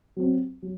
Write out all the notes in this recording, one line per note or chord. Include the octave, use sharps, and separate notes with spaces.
F#3 C4 F#4
F#3